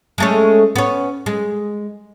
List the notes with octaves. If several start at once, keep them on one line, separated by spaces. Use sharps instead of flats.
G#3 A3 C#4
B3 C#4
G#3